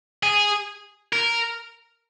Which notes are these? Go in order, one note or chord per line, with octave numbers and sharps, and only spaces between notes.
G#4
A#4